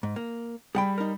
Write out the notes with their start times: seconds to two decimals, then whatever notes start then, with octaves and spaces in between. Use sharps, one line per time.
0.03 G#2
0.16 A#3
0.75 G3 G#4 F#5 G5 B5
0.98 D#4 A#4